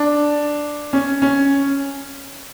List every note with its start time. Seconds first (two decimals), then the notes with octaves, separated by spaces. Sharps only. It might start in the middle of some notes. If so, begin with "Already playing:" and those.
Already playing: D4
0.93 C#4
1.22 C#4